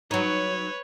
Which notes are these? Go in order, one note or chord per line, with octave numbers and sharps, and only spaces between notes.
F#3 D#4 B4 C#5